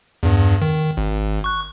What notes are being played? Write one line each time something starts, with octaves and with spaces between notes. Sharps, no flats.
E2 G2
D#3
G#1
C#6 F#6